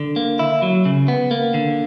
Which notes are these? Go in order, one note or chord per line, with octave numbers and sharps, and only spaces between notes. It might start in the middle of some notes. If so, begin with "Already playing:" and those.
Already playing: D3
A#3
E4
F#3
C#3
B3
A#3
D3